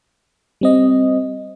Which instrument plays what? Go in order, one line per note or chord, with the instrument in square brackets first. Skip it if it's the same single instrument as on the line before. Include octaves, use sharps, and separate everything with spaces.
[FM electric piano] G3 C4 D#5